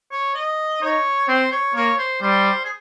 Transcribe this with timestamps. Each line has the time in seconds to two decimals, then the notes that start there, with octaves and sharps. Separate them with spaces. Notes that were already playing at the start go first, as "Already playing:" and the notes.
0.11 C#5
0.35 D#5
0.82 D#4 C#5
1.28 C4 C5
1.52 C#5
1.75 A#3 C#5
1.98 C5
2.21 G3 C5
2.64 G#4